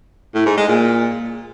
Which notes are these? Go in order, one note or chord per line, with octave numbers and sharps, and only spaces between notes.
A2
G#2
G#3
A#2